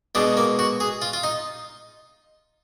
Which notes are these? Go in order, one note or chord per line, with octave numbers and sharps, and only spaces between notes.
B2 G#3 D4
A#3
F#4
G#4
F4
F4
D#4